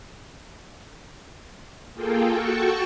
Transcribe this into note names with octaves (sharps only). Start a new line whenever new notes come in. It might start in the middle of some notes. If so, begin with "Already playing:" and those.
A#3 F4 G#4 A4 G5
F#4 A4 G5 A5 C#6